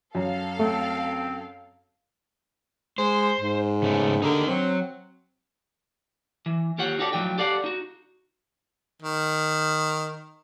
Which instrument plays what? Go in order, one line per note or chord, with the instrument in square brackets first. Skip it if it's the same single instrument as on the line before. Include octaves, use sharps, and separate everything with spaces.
[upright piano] F#2 [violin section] A4 F5
[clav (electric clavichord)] A3 [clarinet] C4
[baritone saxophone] G#3 [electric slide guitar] C5
[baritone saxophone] G#2
[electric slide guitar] C#3 A3 B3
[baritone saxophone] D3 [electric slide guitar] D#4 G4 A#4
[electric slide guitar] F#3 [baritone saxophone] C4
[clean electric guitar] E3
D#2 F4 G4 C#5 F#5
D#4 F#4 G4 A4 D5
A2 F3 F#3 D#4 G5
G4 A4 D5 F5 F#5
D#4 F#4
[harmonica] D#3